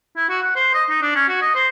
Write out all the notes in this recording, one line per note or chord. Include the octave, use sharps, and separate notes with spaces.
E4
F#4
F#5
C5
D#5
D#4
D4
C#4
F#4
D#5
C5